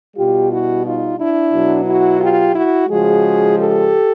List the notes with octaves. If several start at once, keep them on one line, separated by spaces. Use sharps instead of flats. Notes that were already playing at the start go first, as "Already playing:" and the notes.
B2 G3 F4 G4
E4 F#4
D#4 F4
D4 E4
B2 F#3
E4 F#4
F4 G4
E4 F#4
C#3 F3 G#3 F#4 G#4
G4 A4